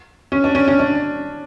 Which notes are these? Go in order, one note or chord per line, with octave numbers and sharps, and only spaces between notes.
C#4
D4
C#4
C#4
D4